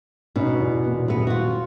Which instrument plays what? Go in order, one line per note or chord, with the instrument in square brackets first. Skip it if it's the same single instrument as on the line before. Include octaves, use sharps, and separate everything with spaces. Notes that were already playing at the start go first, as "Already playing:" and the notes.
[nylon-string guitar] B2 [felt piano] C#4 D#4
[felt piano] E2
A#2
[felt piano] D#1 [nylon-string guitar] F#2 B3
[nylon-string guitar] F4 F#4